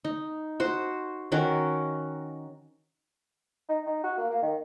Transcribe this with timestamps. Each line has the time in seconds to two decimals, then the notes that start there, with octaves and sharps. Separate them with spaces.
0.05 D#4
0.60 F#4 C5
1.32 D#3 C#4 F#4 A#4
3.69 D#4
3.86 D#4
4.04 F#4
4.18 A#3
4.30 A#3
4.42 D#3